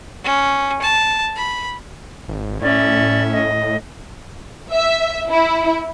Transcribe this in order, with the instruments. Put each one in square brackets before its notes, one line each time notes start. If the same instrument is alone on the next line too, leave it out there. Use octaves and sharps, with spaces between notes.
[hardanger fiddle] C#4
A5
B5
[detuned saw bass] G#1
[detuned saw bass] A2 [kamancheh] C#4 E5 [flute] D5
[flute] D#5
[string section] E5
E4